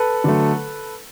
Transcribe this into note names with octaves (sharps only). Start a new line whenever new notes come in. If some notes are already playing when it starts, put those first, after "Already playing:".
Already playing: A4 B4
D3 F#3 A3